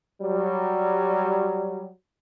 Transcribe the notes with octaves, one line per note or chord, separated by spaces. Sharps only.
F#3 G3